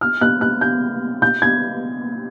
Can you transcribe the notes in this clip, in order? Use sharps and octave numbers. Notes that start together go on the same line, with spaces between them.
F6
F#6
F#6
G6
G6
G#6